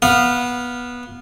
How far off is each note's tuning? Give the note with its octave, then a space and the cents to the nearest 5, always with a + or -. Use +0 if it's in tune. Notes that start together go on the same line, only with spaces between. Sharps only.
B3 -15 F5 +0